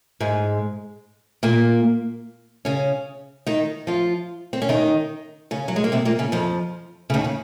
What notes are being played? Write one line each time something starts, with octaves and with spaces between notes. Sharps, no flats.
G#2 G#3
A#2 A#3
C#3 C#4
D#3 D#4
F3 F4
C4
C#4
D#3 D#4
C#3 C#4
F#3
G#3
A#3
C3 C4
A#2 A#3
C#3 C#4
F2 F3
C#3
D#2 D#3
C#3